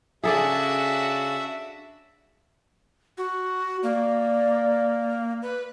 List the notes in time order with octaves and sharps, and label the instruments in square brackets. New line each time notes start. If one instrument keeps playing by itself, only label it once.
[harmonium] C#3 [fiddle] D4 F#4 [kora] G#4 A4 D5 [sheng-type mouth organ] E5
[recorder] F#4
[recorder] A#3 [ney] D5
[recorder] B4